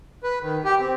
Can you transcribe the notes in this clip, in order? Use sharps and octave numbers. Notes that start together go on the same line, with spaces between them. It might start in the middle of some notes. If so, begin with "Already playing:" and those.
B4
D#3
G4
C4